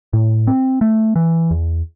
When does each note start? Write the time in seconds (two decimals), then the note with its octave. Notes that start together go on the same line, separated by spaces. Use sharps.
0.13 A2
0.47 C4
0.81 A3
1.16 E3
1.51 E2